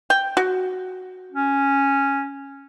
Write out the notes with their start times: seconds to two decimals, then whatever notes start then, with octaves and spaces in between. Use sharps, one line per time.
0.10 G5
0.37 F#4
1.32 C#4